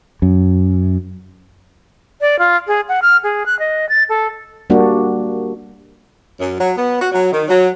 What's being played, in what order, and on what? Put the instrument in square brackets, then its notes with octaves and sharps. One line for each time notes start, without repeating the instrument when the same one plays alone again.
[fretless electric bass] F#2
[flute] D5
F4
G#4
F#5
F6
G#4
F#6
D#5
A6
A4
[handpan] G3 A#3 D4 F#4
[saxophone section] F#2
F#3
B3
F#4
F#3
D#3
F#3